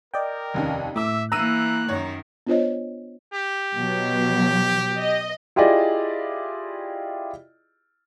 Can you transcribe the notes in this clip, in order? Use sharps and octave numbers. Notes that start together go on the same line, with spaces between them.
A#4 D5 D#5 G5
F1 D#2 C#4
A2 E5 D6 E6
E3 A#3 A#5 E6 F#6 D#7
F#2 D#3 C#5
B3 D4 F4 C5 C#5 D#5
G4
B2 F#3
D#5
E4 F4 G4 G#4 D5 D#5